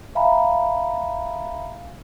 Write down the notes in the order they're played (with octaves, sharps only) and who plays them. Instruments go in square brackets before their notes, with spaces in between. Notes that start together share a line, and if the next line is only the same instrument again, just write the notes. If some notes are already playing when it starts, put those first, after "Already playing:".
[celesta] E5 F5 G#5 A#5 B5